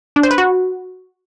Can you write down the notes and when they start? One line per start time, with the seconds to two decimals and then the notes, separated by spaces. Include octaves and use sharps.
0.16 D4
0.23 C5
0.31 B4
0.38 F#4